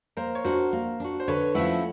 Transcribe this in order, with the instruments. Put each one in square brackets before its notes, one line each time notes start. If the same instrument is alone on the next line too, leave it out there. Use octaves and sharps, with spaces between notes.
[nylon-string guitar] A#3 [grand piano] A#4 C5
[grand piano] C#5
[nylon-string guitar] D4 F#4 [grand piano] A#4 C5
[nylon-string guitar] A#3
D4 F#4
[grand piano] C5
[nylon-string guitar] D3 [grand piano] B4 C#5
[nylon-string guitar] F3 A3 C#4 E4 [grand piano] E5 F#5